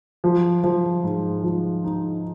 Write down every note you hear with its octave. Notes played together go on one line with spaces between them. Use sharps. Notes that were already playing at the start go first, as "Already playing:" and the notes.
F3
F3
G#2
F3
D#4